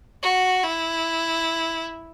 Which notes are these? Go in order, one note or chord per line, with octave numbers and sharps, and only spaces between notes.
F#4
E4